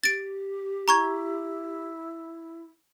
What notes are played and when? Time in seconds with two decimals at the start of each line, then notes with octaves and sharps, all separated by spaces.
0.04 G4 A6 D7
0.88 E4 A#5 C#6 G#6